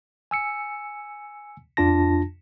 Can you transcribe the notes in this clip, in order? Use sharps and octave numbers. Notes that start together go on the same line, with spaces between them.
G#5 E6 C#7
F2 D4 F4 A5 A#6